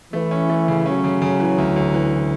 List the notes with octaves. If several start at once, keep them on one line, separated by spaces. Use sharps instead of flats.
E3 A3
C#4
A3
C#3
F#3 C#4
C#3
C#3
E3
D2
D2
E3